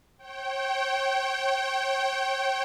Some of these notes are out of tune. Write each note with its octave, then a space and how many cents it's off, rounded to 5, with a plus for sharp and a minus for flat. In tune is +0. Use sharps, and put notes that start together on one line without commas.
C#5 -40 G5 -25